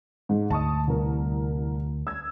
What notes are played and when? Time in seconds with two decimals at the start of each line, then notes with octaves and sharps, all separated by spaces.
0.29 G#2
0.50 D2 A5 C#6 D#6
0.87 C2 A#4
2.07 E6 G#6